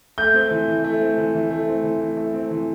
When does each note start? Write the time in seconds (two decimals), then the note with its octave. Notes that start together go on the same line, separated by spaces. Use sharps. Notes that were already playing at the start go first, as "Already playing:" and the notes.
0.18 A3 G6
0.34 C4
0.51 E3
0.68 E3
0.84 A3
1.00 C4
1.18 E3
1.35 E3
1.51 A3
1.68 C4
1.84 E3
2.01 E3
2.17 A3
2.33 C4
2.51 E3